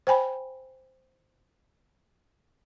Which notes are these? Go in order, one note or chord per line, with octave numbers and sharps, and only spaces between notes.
C5 G5 G#5 B5